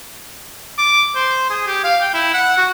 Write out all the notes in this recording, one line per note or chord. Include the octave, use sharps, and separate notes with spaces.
D6
C5
G#4
G4
F5
G5
E4
F#5
F#4